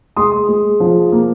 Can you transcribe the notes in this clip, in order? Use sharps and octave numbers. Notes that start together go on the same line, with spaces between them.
G#3 C6 D#6
G#3
F3
A#3